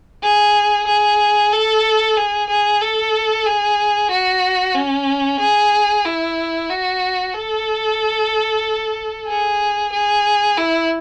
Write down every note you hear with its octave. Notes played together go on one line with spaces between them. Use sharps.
G#4
G#4
A4
G#4
G#4
A4
G#4
F#4
C#4
G#4
E4
F#4
A4
G#4
G#4
E4